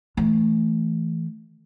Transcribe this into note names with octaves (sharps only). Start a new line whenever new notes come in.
E3 A3